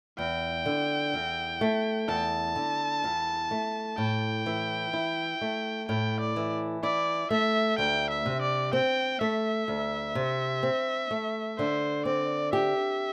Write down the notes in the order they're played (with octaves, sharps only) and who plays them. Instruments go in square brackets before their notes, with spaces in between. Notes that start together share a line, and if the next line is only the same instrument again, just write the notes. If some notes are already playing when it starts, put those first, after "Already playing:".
[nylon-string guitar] E2 [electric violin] G5
[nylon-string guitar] D3
E2
A3
[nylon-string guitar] E2 [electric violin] A5
[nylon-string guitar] D3
E2
A3
[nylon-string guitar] A2 [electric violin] G5
[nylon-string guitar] E3
E4
A3
[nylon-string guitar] A2 [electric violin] G5
[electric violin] D5
[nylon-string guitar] E3
[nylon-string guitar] E4 [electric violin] D5
[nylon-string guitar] A3 [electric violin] E5
[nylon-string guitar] D2 [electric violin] G5
[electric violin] E5
[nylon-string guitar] C3
[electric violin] D5
[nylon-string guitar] C4 [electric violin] G5
[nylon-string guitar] A3 [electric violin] E5
[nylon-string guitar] D2
C3
C4
A3
[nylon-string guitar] D3 [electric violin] C5
[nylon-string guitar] C4 [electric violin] D5
[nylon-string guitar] G4 [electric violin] E5